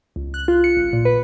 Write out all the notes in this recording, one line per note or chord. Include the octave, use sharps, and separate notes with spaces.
C#2
F#6
F4
C#7
A1
A#2
B4